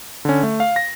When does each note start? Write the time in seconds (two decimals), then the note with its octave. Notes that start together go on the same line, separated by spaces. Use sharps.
0.25 D3 C#4
0.43 A3
0.60 F5
0.76 A#6